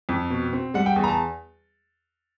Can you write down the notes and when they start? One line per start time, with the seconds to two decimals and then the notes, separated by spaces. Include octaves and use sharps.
0.09 F2
0.30 B2
0.53 C4
0.74 G3 F#5
0.86 G5
0.96 E2
1.04 A#5
1.08 A5